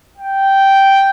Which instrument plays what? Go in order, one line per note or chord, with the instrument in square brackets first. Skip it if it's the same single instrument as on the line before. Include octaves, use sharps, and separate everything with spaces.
[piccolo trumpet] G5